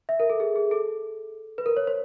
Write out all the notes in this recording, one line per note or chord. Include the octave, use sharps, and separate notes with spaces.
E5
A#4
A4
G#4
G#4
A4
B4
A#4
C#5
C5